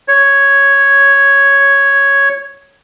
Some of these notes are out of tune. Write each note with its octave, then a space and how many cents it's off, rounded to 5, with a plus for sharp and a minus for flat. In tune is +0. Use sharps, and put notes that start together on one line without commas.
C#5 +0